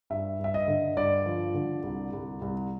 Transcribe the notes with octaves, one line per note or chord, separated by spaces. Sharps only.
G2 E5
G2 E5
D#5
D3
G2 D5
F3
D3
C2
C2
C2